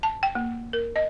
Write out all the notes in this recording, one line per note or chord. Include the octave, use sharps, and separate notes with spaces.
A5
G5
A#3
A#4
D#5